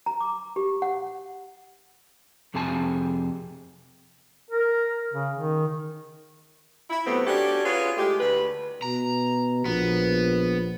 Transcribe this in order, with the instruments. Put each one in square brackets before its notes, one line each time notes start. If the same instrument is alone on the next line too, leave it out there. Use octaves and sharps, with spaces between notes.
[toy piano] A#5
D6
G4
F#5
[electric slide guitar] F2 C3 G#4 G#5 A5
[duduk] A#4
C#3
D#3
[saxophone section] E4
C3 F#3 A3 B3 C4
C#4 D4 F#4 G4 A4
F4 F#4 G#4 B4 C#5
A2 G#3 A3 G4
D2 G3 B4
[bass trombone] B2 [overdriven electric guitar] A#5
[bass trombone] A#1 [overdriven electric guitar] B3